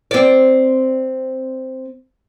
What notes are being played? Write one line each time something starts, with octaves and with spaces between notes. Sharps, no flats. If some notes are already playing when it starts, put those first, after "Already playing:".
C4 D5